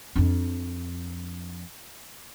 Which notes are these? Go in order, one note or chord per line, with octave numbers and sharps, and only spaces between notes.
F2 D4